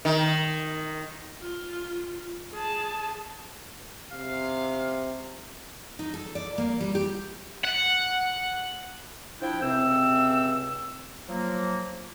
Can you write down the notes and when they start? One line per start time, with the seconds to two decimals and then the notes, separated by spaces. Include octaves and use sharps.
0.05 D#3
1.41 F4
2.52 G#4 A5
4.11 C3 F5
5.99 D#4
6.14 A4
6.35 D5
6.58 A#3
6.81 G3
6.95 G4
7.64 F#5
9.40 F3 D4 E4 G5
9.61 C#2 C3 C4 E6
11.29 F3 F#3 A#3